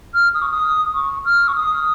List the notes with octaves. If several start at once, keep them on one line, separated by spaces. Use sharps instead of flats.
F6
D#6
C#6
D#6
C#6
F6
C#6
D#6